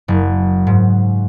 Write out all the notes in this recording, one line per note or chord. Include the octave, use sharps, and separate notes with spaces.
F#1
G#2